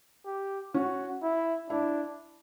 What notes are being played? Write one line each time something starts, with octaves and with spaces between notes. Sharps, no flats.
G4
C#4 F#4
E4
D4 E4